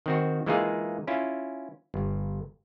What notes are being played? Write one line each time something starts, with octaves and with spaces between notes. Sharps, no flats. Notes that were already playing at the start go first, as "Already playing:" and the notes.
D#3 C4 F#4
E3 G#3 A#3 D#4 F4 G#4
C#4 E4 F4
G1